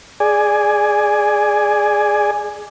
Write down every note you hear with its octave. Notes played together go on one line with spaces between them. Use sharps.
G#4 D5 G#5